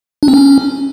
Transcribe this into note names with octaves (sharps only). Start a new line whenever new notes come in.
D4
C4
C#4